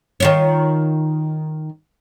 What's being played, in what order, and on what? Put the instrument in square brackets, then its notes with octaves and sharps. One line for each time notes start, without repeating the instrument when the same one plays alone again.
[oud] D#3 F4 C#5